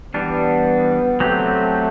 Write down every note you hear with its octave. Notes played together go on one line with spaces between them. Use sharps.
E3 G3 B3 D4
F#3 A3 C4 G4